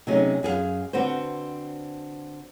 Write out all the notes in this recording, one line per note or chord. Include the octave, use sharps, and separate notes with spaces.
C3 F#3 A3 C#4 D#4 G#4
F#2 G#4 A#4 F5
D3 C4 F#4 B4 C5